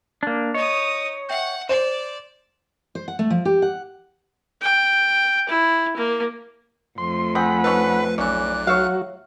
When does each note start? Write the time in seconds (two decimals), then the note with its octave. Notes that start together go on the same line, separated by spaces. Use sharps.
0.23 A#3 D4
0.54 D#4 C#5 D#5 D#6
1.29 E5 F#5 G5 G6
1.69 C5 D5 E7
2.95 C5
3.08 F#5
3.19 A3
3.30 F3
3.45 G4
3.62 F#5
4.62 G5
5.49 E4
5.97 A#3
6.98 F2 A3 C6
7.35 C4 G#4 F#5 B5
7.64 C#4 D#4 A4 B4
8.18 B1 E3 C#4 D5 F#6
8.67 F#3 F#4 C#5 E5 F5